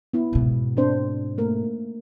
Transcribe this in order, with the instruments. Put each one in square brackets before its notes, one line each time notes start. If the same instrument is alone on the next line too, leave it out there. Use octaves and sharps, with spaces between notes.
[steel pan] B3 E4
[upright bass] G#2 B2
[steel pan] C4 D4 C5
A3 A#3 A#4